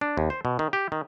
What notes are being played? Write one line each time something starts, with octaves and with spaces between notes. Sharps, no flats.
D4
D#2
C5
B2
D#3
G4
D#3